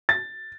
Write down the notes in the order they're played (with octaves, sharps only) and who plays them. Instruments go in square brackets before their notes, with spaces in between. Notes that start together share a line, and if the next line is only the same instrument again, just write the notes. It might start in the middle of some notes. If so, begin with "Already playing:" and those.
[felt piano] A6